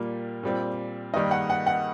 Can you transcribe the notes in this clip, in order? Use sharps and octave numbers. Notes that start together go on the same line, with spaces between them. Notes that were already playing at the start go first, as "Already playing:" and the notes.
Already playing: A#2 G3 A#3
A#2 G3 C4
G2 D#3 G3 A#3 D#5
F#5
F#5
F#5